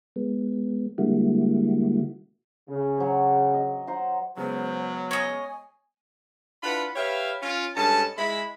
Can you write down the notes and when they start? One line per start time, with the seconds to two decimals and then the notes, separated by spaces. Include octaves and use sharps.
0.16 G#3 B3
0.98 D3 G3 G#3 A#3 E4 F#4
2.68 C#3
2.98 F#3 C5
3.54 D#5
3.87 C5 F#5 A#5
4.37 C#3 F#3 G#3 B3 C5
5.11 C#5 D#5 G#5
6.63 D4 E4 F4 B4 F#5 B5
6.95 G4 B4 C#5 E5 F5
7.42 C#4 F4
7.76 G2 G#3 C#4 A4 A5
8.18 G#3 E4 B5